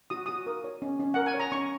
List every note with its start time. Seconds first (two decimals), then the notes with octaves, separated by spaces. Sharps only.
0.10 F#4 D#6
0.26 F#4 D#6
0.47 A#4
0.64 C#5
0.82 C#4
1.00 C#4
1.14 A#4 F#5
1.26 G#5
1.34 C#5
1.40 A#5
1.52 C#4 C#6